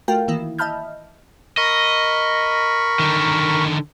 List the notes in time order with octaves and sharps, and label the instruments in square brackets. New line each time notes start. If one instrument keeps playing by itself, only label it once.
[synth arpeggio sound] A3 F4 F#4 A#4 F5 G5
D#3 E3 A#3 E4
D#5 E5 A5 B5 F6 G6
[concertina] A#4 B5 C#6 [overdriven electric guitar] D#5
[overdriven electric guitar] D3 D#3